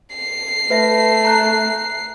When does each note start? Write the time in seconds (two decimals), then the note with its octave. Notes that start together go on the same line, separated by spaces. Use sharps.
0.16 C7
0.70 A3 B4 E5 A#6
1.25 A#5 F#6